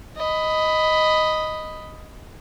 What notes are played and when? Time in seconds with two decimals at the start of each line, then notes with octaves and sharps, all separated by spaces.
0.17 D#5 B5